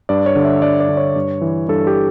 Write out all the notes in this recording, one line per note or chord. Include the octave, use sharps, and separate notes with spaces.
G2 D5
C#5
D3
E5
G2 D5
D5
D3
C#5
G2
E3
G2 A4
G4